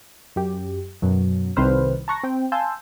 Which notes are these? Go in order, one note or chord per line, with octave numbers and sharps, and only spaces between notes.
F#2 G4
F#2 B2 F#3
C2 D#3 C4 B4 C5 F6
A5 A#5 C#6 F#6 A#6
C4 G5
F5 G#5 A5 C6 E6 G6